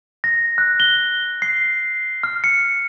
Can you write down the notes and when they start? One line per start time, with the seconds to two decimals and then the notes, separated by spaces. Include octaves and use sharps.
0.24 A#6
0.58 F#6
0.80 G7
1.42 C7
2.23 F6
2.44 C#7